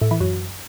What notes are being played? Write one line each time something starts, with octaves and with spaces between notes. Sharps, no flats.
A2
E3
F#2